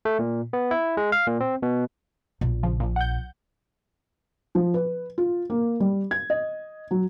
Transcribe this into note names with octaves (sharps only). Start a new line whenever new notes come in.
A3
A#2
B3
E4
G#3
F5
A#2
C4
B2
A#1 B2
C#3 F3
A#2 F3
F#5 G6
F3
B4
F4
A#3
G3
G#6
D#5
F#3